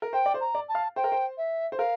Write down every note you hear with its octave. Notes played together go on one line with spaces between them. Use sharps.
A#4
C5 G5
D5
C5
A#5
D5
A5
F5
C5 G5
A#4
C5
E5
C5
A#4 F5